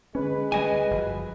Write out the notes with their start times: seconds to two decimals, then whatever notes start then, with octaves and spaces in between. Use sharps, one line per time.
0.15 D3 G#3 C#4 B4
0.52 D2 G3 D#5 G#5
0.91 F#1 F3